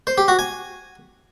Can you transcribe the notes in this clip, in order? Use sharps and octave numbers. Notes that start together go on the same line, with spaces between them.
C5
G4
F#4
G#5